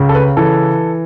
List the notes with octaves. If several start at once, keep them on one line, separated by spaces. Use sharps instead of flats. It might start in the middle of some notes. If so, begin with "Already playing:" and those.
Already playing: C#2 C#3
A4
B4
E3 A4